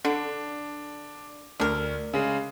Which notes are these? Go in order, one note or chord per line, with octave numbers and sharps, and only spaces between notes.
D3 D4
D2 D4 A#4
C#3 G#3